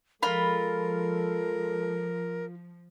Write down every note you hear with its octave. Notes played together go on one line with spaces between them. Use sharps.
F3 G#3 F4 A4 A#4 B5